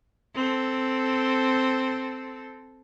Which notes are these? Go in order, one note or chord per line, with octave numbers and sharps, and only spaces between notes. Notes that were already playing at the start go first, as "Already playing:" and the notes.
C4 A4